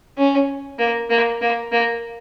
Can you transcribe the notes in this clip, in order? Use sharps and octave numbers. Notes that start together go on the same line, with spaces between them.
C#4
A#3
A#3
A#3
A#3